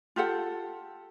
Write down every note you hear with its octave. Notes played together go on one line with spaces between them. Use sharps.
F4 G4 A4 F#5